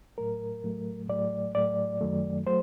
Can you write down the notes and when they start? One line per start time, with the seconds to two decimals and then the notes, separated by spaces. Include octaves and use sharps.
0.18 A2 F#3 A3 A#4
0.64 A2 F#3 A3
1.09 A2 F#3 A3 D5
1.55 A2 F#3 A3 D5
2.01 F#2 D#3 F#3 A3
2.46 F#3 A3 C5